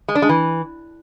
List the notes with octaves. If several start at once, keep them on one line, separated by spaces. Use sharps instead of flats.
G#3
D4
G#3
E3